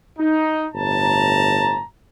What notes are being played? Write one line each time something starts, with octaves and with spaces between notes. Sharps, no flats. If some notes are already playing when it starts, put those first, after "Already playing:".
D#4
G1 A2 A5 A#5